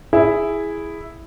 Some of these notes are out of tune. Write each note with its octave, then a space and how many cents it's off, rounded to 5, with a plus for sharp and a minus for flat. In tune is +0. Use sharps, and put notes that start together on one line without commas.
E4 +0 G#4 -5